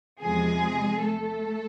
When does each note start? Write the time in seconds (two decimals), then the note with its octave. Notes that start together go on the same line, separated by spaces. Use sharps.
0.22 E2 C3 F3 G#3 G#4
1.03 A3 A4